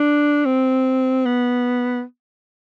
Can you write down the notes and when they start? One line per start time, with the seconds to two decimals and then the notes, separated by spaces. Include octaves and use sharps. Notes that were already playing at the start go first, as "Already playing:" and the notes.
Already playing: D4
0.45 C4
1.26 B3